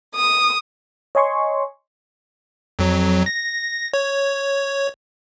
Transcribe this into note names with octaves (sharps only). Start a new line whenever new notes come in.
D#6
C#5 D#5 G#5 C6 C#6
F2 F#3
A#6
C#5